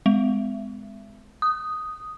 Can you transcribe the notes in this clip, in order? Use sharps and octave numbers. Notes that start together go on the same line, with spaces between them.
G#3
D#6